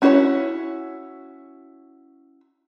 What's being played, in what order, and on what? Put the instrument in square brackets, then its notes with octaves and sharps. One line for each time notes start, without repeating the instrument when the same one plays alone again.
[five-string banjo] C#4 E4 F#4 C5 C#5